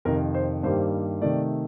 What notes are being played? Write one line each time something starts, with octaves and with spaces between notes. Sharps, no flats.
F2 C3 D#3 A#4
C5
G2 D#3 G3 A#3 C5
C3 D#3 A3 D5